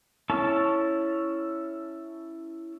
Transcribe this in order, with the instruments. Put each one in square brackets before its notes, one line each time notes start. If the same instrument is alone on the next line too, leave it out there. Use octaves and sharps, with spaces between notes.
[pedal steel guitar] C#4 E4 A4 A5